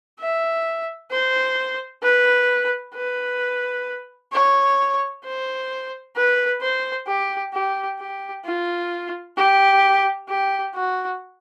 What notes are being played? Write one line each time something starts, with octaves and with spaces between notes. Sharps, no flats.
E5
C5
B4
B4
C#5
C5
B4
C5
G4
G4
G4
F4
G4
G4
F#4